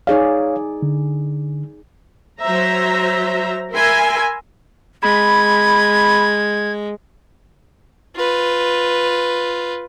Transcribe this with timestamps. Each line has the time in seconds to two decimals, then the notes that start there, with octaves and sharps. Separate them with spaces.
0.07 D#4 G#4 C#5 D5 F5
0.82 D3
2.41 F#3 C5 E5 A#5
3.73 A#4 E5 G#5 B5 C6
5.03 G#3 B5 G#6
8.17 F4 B4